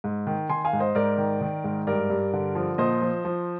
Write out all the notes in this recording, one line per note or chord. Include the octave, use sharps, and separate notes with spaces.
G#2
D#3
D#3 G#5 C6
F5 G#5
G#2
C5 D#5
G#2 A#4 D5
D#3
D#3
G#2
G2 A#4 D5
G2
D3
F3
A#2 C5 D#5
F3
F3